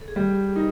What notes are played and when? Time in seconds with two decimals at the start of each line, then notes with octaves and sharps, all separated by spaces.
0.01 A4
0.08 G#4
0.16 G3 G4
0.56 D#4 A#4